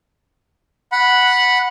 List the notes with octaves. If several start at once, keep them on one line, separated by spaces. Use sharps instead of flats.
F#5 B5